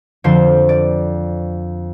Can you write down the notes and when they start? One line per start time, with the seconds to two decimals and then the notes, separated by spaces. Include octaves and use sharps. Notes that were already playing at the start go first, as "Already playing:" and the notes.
0.24 F2 D3 F3 C5
0.69 D5